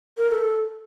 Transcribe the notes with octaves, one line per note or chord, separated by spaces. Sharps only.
A#4
A4